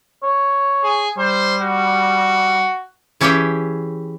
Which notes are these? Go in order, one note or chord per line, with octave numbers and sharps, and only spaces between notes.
C#5
G#4
G3 C5
F#4
E3 C#4 E4 G4 G#4 G5